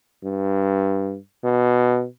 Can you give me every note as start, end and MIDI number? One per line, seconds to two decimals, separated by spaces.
0.24 1.16 43
1.44 2.05 47